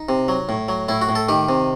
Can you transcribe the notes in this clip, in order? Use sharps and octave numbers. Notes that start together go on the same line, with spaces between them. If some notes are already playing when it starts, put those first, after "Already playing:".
Already playing: D#4
C3
F#3
A2
F#3
A2 E4
F#4
A2
A4
D#3 G4
C3